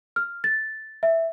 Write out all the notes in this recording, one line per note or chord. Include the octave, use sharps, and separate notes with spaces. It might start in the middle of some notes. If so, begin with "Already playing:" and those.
F6
A6
E5